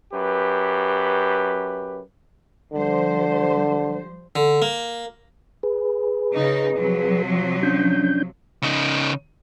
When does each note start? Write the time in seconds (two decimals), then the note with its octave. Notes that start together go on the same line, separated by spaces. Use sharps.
0.12 F#2 G4 B4
2.72 D3 F3 G3 C5
4.36 D3
4.62 A#3
5.63 G#4 B4
6.35 C#3 D#4
6.78 C3 F3 F#3
7.63 C#4 D4 G6
8.62 C#3 D#4